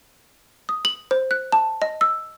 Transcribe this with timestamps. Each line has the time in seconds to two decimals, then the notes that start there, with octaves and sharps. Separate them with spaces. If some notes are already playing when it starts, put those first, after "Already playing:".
0.69 D#6
0.85 F#7
1.11 C5
1.31 F#6
1.52 A5
1.82 D#5
2.01 E6